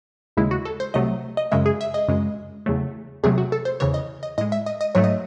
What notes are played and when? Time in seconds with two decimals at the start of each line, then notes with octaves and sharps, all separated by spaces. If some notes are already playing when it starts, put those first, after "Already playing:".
0.37 D#2 C#3 G#3 E4
0.51 F#4
0.65 A4
0.80 C5
0.94 C2 C3 F#3 A3 D#5
1.37 D#5
1.52 F#2 C#3 G#3 E5
1.66 G#4
1.81 E5
1.94 D#5
2.08 F#2 C#3 G#3
2.66 E2 C#3 F#3 A3
3.23 E2 C3 F#3 A3 G#4
3.38 F#4
3.52 A4
3.65 C5
3.80 E2 C#3 E3 C#5
3.94 D#5
4.23 D#5
4.38 A2 D#5
4.41 G#3
4.52 E5
4.66 D#5
4.81 D#5
4.95 G#2 F#3 A3 C#5
5.04 D#5